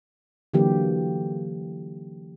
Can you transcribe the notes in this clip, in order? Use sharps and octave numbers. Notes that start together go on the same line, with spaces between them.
D3 E3 F#3 A#3 G4